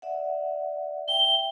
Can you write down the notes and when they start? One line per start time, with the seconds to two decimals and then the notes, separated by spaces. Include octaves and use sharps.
0.02 D5 E5 F#5
1.08 E5 G5 G7